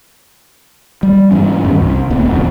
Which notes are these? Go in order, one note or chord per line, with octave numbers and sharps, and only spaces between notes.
G3
G#2 E3 C#4
E2 G2 D#3
C2
D1 D2 B3 C4
E1 F2 G#2 D3